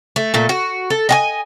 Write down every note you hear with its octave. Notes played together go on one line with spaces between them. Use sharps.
A3
A#2 A3
F#4
A4
D#5 F#5 G#5